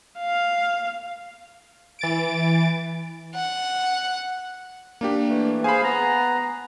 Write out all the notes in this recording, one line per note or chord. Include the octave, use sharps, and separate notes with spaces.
F5
E3 A6 D7
F#5
A#3 D4 G4
E3 A3
G#4 C5 F5 G#5 B5
B3 A#5